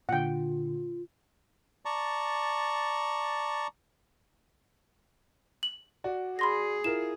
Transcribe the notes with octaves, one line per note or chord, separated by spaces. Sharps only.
A#2 D3 F4 F#5 G5
D5 A5 A#5 C#6
F#7
F#4 D5
G#4 B5 C6 A#6
E4 F4 A#4 E7